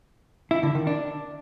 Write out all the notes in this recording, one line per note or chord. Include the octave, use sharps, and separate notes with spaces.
E4
D3
D#3
D4